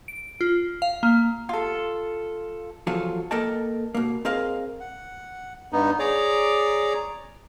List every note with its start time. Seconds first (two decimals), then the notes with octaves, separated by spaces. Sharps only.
0.08 D7
0.41 F4
0.82 F5
1.03 A#3
1.49 F4 A4
2.87 E2 F3 F#3 F4 A4 G#5
3.31 A#3 A4 A#4 D#5 G5 A5
3.95 B2 A#3
4.25 C4 G#4 A#4 D#5 F5
4.80 F#5
5.72 G2 B3 D#4
5.99 G#4 C#5 D5 A#5 D6